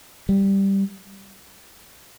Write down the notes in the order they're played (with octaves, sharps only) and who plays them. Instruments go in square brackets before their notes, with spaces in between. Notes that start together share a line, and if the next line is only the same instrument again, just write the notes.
[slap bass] G3